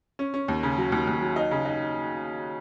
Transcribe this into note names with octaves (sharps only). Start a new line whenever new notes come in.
C#4
C#4
D#2
C#3
F#3
D#2
D#2
F#3
D#4
C#3
D#4